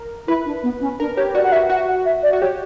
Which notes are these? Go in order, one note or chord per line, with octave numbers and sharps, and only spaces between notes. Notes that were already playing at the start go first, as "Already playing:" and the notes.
Already playing: A#4
E4 B4
D4
B3
C#4
D4 A#4
G4 C#5
F#4 D5
F#5
F#4 E5
F#4 F#5
F#5
E5
D5
F#4
G4 C#5